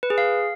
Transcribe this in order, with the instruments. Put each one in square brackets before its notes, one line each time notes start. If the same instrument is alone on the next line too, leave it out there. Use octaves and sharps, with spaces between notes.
[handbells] B4
G#4
F5